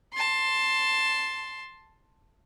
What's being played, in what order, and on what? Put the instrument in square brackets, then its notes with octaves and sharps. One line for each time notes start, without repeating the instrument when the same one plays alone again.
[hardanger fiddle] A5 C6